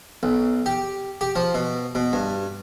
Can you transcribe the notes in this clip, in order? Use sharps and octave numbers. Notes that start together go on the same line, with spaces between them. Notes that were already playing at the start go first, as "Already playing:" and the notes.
B1
G4
G4
F3
B2
B2
G2